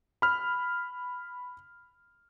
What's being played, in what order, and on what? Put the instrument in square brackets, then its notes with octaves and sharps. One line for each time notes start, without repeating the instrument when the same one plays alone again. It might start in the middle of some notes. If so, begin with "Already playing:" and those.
[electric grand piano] B5 F6